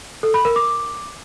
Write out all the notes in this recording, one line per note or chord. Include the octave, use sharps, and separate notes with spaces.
A4
B5
A#4
D6